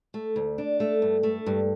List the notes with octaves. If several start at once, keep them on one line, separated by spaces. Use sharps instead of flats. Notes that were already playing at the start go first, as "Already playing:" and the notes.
A3
D2
D4
A3
G2
A3
G2